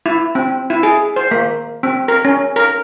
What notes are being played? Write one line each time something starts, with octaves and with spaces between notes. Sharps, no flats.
E4
C4
E4
G#4
C5
A#3
C4
A#4
C#4
A#4